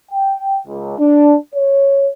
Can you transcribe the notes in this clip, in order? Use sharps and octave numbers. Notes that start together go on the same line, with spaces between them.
G5
C#2
D4
C#5